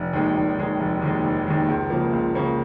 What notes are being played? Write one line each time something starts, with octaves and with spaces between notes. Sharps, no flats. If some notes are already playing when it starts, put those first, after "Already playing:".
Already playing: F1
D#2 D#3 G#3
F1
D#2 D#3 G#3
F1
D#2 D#3 G#3
F1
D#2 D#3 G#3
C#2
C#3 F3 A#3
C#2
C#3 F3 A#3